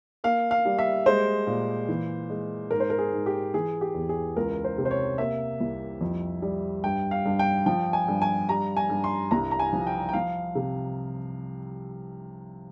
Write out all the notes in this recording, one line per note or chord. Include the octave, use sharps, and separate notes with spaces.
A#3 F5
F5
G3
E5
G#3 C5
A#2
E3
G#3
G#2 A#4
C5
A#4
G#4
G#2
G4
E3 G#4
G4
E2
G#4
C#2 A#4
C5
C3
C5
C#5
A#3 E5
C2
F2
G3
G2 G5
F5
G2
G5
F3 G5
G#5
G2
G#5
G3 A#5
G#5
G2
C6
C2 A#5
A#5
G#5
F3
G5
G5
F3 F5
C3